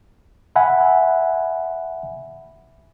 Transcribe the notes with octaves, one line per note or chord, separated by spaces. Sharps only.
E5 F#5 G#5 B5